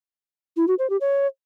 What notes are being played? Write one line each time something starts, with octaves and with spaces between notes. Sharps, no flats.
E4
F#4
C5
G4
C#5